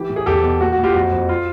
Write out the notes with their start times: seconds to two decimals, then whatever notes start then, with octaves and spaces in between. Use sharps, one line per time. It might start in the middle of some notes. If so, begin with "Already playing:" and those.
Already playing: E3 G4
0.09 A2
0.16 G#4
0.26 E2 G4 A4
0.44 B2
0.60 A#2 F#4
0.72 F#4
0.78 A#2
0.83 F4 G4
0.94 F2 F#4
1.12 F2
1.29 F4